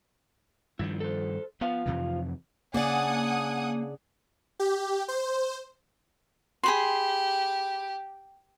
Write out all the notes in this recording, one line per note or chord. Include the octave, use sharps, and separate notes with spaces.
G2 D#3 F3 E4
A4 C5
F3 B3 F4 F5
F2 C3 E3
C#3 A#3 D4 D5 F#5 G#5 D#6
G4
C5
G4 G#4 B5 C6